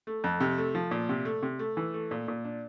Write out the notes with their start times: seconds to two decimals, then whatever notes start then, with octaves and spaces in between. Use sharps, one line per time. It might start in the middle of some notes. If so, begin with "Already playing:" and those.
0.07 A3
0.24 F2
0.40 C3
0.58 A3
0.75 F3
0.91 A#2
1.09 C3
1.25 A3
1.43 C3
1.59 A3
1.77 E3
1.94 A3
2.11 A#2
2.28 A#2
2.44 D4